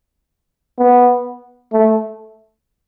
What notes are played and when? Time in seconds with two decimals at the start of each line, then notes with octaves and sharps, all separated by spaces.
0.78 B3
1.73 A3